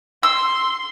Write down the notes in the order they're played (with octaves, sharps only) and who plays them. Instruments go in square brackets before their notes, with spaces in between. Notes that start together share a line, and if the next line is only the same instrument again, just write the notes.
[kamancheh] C6 [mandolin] E6